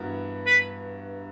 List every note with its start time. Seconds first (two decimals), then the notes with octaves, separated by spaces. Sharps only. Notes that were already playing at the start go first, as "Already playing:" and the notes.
Already playing: G2 E3 B3 F#4 A#4
0.46 B4